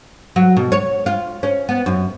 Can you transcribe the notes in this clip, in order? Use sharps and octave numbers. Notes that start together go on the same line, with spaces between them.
F#3
B2
C#5
F4
C#4
B3
F#2